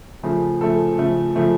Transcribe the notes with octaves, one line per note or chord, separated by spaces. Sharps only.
C#3 F3 A3
C#3 F3 A3 A4
C#3 F3 A3
C#3 F3 A3